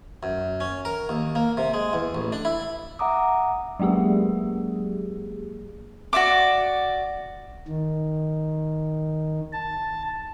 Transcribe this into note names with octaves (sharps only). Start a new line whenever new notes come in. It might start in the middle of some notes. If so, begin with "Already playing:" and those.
F#2
C#4
A#4
D#2
A#3
C3
G#3
E2
A1
D4
E4
E5 F#5 A#5 D6 D#6
F#3 G#3 A#3 G4 G#4
F#4 D5 E5 D6
D#3
A5